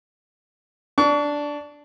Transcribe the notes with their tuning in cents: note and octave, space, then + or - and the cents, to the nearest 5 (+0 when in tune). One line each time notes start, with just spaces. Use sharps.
D4 -5 C#6 +40